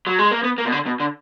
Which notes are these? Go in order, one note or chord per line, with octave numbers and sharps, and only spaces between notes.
F#3
G#3
A#3
B3
A#3
B2
D3
B2
D3